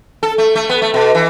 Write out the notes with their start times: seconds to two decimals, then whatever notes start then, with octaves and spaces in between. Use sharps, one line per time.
0.23 A4
0.38 A3
0.55 A3
0.70 B3
0.82 A3
0.94 B2
1.15 E3